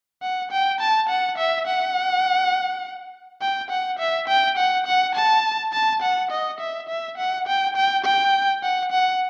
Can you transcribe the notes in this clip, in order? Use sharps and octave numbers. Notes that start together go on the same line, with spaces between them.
F#5
G5
A5
F#5
E5
F#5
G5
F#5
E5
G5
F#5
F#5
A5
A5
F#5
D#5
E5
E5
F#5
G5
G5
G5
F#5
F#5